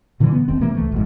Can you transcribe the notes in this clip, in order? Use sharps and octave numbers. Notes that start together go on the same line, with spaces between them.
A#2 D3 E3 F#3
B3
F1 D#2 C4
C3 E3 A3 A#3
C#2 C3 A3
G#1 F2 G#2